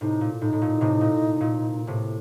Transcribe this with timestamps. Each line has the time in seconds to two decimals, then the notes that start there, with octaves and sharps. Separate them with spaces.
0.01 A2 C3 D#4
0.21 A#2
0.41 A2 D#4
0.53 A2
0.62 A#2
0.81 A2 C3
1.01 A#2
1.41 A#2
1.87 A2 C3